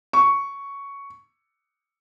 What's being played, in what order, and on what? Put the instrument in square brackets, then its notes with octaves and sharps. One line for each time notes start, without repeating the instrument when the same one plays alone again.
[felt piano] C#6